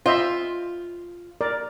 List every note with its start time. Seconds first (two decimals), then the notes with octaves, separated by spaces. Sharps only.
0.06 F4 C5 D#5 E5
1.41 A#4 D5